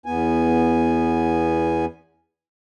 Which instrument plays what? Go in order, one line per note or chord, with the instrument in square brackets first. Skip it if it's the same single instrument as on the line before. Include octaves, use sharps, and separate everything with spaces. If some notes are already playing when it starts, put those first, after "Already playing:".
[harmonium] E2 B3 G#5